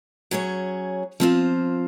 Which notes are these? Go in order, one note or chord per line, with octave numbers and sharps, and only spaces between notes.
F#3 C#4 G#4 C#5
F3 C4 F4 C5